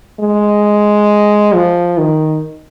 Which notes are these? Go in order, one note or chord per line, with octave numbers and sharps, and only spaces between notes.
G#3
F3
D#3